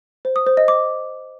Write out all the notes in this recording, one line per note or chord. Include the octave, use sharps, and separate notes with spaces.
C5
D#6
C5
D#5
D6